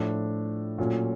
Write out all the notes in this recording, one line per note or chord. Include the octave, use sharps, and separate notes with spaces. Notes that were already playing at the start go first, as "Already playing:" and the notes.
Already playing: A2 F3 A3 D4
A#2 F#3 A3 C#4 F4